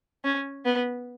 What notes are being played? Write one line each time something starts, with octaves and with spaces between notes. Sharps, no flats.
C#4
B3